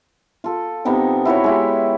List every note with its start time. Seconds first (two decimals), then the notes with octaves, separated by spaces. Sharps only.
0.44 F4 A4
0.85 C3 B3 D#4 G5
1.25 E4 F#4 B4 C#5
1.44 G#3 E4 G4